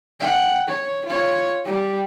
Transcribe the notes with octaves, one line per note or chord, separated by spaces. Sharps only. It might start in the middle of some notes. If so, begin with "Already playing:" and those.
F#5 G5
C#5
F4 C#5
G3 G4